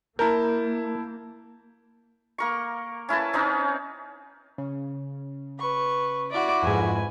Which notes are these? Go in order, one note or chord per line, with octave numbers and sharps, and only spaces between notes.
A#3 E4 A#4 A5 G6
A#3 A#4 C#6
C#4 E4 B4 A5
C4 C#4 D#4 B4
C#3
B4 C#6
E4 F#4 D5 D6
F2 G#2 B4 G#5